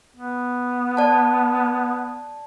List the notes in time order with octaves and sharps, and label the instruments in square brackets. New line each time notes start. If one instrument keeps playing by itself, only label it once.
[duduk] B3
[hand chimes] D5 A5